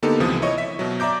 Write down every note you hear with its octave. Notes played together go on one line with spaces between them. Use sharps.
D3 A#3 B3 D#4 G4 A4
C#2 C3 E3 F3 D#6
E4 C#5 D#5 C#6
E5 B6
B2 F#3
D5 E5 A#5 D6 G6